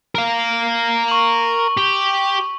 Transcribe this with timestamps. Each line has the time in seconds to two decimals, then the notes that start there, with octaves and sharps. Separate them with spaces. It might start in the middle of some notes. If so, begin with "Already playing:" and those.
0.15 A#4 F5
1.08 C#6 F#7
1.77 G4